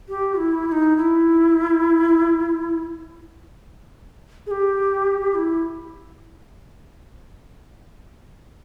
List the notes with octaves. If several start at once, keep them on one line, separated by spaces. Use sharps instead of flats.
G4
E4
E4
D#4
E4
G#4
G4
E4